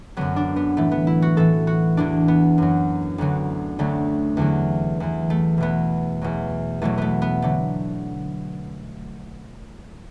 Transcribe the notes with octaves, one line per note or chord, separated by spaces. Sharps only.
F#2 D3 F#3 B3
D4
B3
A2 E3 A3
B3
E4
F#4
A2 E3 A4
F#4
E2 E3 D4
B3
F#2 F#3
D2 D3 F#3
D2 D3 F#3 A3
E2 D3 F#3
E2 E3
A3
E2 B2 F#3 B3
E2 B2 F#3
E2 B2 F#3 A3
A3 B3
B3
D3 F#3 A3